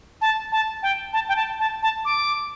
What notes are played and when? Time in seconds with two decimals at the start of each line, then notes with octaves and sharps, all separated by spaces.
0.21 A5
0.52 A5
0.83 G5
1.13 A5
1.29 G5
1.36 A5
1.60 A5
1.83 A5
2.05 D6